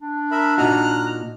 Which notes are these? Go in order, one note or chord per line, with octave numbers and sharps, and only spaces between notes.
D4
A#4 E5 B5
A#2 D#4 F#4 A#5 F6 F#6